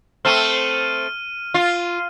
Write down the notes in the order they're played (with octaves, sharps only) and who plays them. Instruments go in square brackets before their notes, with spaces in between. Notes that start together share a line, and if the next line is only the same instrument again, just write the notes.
[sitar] A3 C4 [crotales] F6 D#7
[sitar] F4